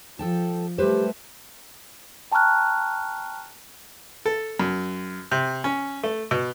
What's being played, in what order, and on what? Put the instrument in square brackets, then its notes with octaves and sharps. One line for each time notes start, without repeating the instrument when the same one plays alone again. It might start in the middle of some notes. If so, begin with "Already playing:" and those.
[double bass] F3 [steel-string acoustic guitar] A4 G5 A5
[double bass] G3 A3 [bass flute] G4 [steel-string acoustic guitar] B4 C5
[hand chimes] G5 A5 A#5 C#6 F6 F#6
[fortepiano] A4
F#2
C3
C#4
A3
B2